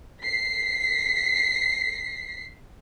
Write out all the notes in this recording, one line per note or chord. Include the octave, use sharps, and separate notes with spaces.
B6 C7